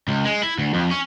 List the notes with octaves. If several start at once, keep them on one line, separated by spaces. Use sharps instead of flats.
C#2
G#3
E4
D2
F2
C#4